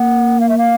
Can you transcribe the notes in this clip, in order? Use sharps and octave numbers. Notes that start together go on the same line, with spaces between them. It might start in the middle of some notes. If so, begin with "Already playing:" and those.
Already playing: A#3 F#5
F5
E5
F5